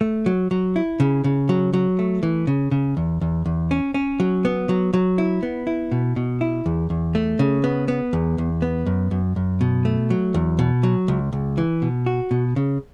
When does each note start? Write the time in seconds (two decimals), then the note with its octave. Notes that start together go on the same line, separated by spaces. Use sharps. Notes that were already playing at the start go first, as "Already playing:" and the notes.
0.01 A3
0.26 F#3
0.51 F#3
0.76 E4
1.00 C#3
1.24 C#3
1.49 F#3
1.74 F#3
1.99 A3
2.23 E3
2.47 C#3
2.71 C#3
2.97 E2
3.21 E2
3.46 E2
3.71 C#4
3.94 C#4
4.20 F#3
4.45 B3
4.69 F#3
4.94 F#3
5.18 E4
5.43 B3
5.67 E4
5.92 B2
6.16 B2
6.41 E4
6.66 E2
6.90 E2
7.15 A3
7.39 C#3
7.64 B3
7.88 B3
8.13 E2
8.38 E2
8.62 B3
8.86 F#2
9.11 F#2
9.36 F#2
9.61 B2
9.85 A3
10.10 F#3
10.34 E2
10.59 B2
10.83 F#3
11.08 C#2
11.33 C#2
11.58 E3
11.82 B2
12.06 F#4
12.31 B2
12.56 C#3